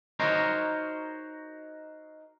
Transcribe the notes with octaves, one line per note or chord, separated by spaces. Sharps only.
D#4 F#4 A#4 C5 C#5 D#5